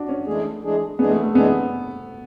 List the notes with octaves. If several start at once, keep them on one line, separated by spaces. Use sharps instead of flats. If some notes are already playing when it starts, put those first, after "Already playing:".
Already playing: D4 F#4
C#4
E3 G#3 A3 D4 G#4
E3 G#3 D4 G#4
E3 G#3 B3 D4 G#4
A3
A3
E3 G#3 B3 D4 G#4